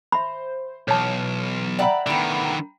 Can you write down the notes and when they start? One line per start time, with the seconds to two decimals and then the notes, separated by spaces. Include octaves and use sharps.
0.12 C5 E5 B5
0.88 B1 E3 C#5 A5 F6
1.79 D5 E5 F#5 G5 A#5 B5
2.07 A2 D3 D#3 B3